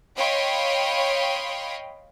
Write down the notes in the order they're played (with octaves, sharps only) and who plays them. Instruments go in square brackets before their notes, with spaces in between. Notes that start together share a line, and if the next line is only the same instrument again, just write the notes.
[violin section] C#5 D#5 F5 G5 B5 C6